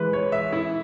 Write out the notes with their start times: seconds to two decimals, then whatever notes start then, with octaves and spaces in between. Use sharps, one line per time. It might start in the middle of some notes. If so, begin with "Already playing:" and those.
Already playing: E3 G#3 B4
0.13 C#5
0.32 E5
0.53 E4